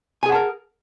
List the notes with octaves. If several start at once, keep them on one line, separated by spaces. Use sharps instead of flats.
G#4 A#4 F#5 G#5 A5